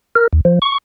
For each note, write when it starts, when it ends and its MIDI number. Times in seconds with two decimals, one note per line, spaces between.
0.15 0.27 70
0.33 0.41 39
0.45 0.59 53
0.62 0.78 85